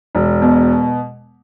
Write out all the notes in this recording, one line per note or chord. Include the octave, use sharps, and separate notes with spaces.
E1
B2